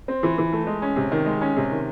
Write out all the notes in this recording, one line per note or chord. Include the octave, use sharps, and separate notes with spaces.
C4
E3
E3
A3
G#3
C#4
C3
D#3
G#3
C#4
C3
D#3